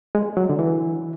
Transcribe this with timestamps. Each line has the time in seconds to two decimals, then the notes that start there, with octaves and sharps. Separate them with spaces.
0.15 G#3
0.37 F#3
0.49 D3
0.59 E3